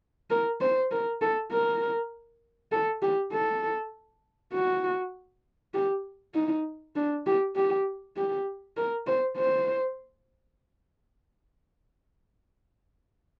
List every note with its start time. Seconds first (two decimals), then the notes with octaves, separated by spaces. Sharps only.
0.30 A#4
0.61 C5
0.91 A#4
1.21 A4
1.51 A#4
2.72 A4
3.02 G4
3.33 A4
4.53 F#4
5.74 G4
6.34 D#4
6.96 D4
7.26 G4
7.56 G4
8.16 G4
8.77 A#4
9.07 C5
9.37 C5